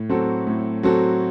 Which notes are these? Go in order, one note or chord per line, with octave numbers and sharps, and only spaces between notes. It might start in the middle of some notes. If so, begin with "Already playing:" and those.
Already playing: A2
F#3 C4 F#4 A4
A2
F#3 C4 F#4 A4